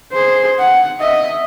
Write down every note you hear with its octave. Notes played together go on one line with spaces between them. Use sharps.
G#4 C5
F#5
D#5 E5